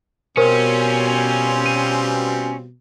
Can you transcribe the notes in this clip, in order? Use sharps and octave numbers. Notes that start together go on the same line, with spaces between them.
B2 G3 C4 C#4 F4 A#4 C5
D#7